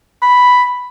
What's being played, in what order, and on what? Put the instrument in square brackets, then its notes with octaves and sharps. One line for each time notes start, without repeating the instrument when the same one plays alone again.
[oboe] B5